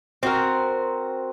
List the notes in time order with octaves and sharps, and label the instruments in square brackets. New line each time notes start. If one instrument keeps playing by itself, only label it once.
[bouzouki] C4 F#4 A#4